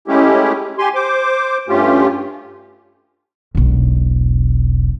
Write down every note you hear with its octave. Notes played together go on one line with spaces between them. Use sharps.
G#3 A3 C#4 E4 G4
G4 G#5 C6
C5 D6
G2 A3 C#4 F4 G4
E1 B1